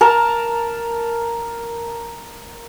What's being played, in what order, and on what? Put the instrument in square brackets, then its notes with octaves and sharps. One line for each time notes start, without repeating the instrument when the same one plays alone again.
[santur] A#4 A5 A#5